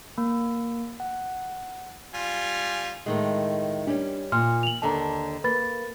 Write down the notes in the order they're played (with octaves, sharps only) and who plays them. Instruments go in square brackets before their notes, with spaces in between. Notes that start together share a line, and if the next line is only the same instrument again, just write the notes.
[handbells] A#3
F#5
[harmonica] G3 F4 G#5
[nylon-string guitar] A2 D#3 G#3
[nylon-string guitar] G3 C#4 [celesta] D4
[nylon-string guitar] A#2 [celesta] C6 F6
[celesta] F7 F#7
[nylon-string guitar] D#2 D3 [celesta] A5 A#5
[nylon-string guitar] A#3 [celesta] B4 B5 A6